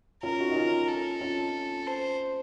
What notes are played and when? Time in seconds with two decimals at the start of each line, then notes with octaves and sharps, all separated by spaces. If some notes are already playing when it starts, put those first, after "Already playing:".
0.23 C#4 F4 A#4
0.40 D#4 F#4
0.51 D#4
0.56 C#4 F4
0.88 A4
1.21 C#4 F4
1.87 C5